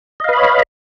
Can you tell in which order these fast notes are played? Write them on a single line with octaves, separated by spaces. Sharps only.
D#5 F5 B4 B5 C#5